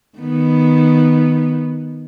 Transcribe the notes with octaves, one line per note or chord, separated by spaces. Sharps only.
D#3 B3